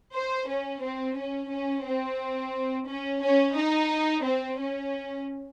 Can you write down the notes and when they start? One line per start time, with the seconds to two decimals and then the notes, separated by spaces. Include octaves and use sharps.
0.13 C5
0.48 C#4
0.82 C4
1.16 C#4
1.50 C#4
1.84 C4
2.87 C#4
3.22 C#4
3.56 D#4
4.23 C4
4.58 C#4